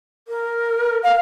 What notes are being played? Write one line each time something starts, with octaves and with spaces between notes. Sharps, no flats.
A#4
F5